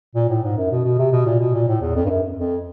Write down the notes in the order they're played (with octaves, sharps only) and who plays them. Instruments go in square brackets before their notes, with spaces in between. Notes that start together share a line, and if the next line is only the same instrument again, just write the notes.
[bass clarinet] A#2
A2
G#2
F#2
B2
B2
C3
B2
A#2
B2
A#2
A2
E2
F2
G2
F#2
F2